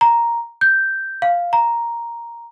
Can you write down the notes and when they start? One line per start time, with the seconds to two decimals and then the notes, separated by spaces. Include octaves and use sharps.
0.01 A#5
0.61 G6
1.22 F5
1.53 A#5